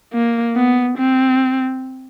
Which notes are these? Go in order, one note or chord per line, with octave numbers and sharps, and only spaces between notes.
A#3
B3
C4